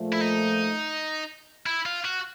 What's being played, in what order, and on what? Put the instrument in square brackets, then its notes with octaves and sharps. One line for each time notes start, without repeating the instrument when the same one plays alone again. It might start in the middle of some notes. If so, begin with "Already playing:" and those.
Already playing: [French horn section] A#2 F3 A3
[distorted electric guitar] E4
D#4
E4
F4
F#4